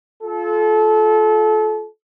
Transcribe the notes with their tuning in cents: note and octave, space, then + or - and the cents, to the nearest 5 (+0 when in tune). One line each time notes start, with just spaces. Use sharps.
F4 +0 A4 -30